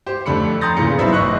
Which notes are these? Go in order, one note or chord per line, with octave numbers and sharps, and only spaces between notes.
G4 C5
F2 D3 A3 B5 C#7
A#5 C6 D#6 G6 A6 A#6
E2 A#2 C#3 E3 C#7
B1 B2 F#3 C5 E5 B5
A1 E2 A2 D#5 C#6 F#6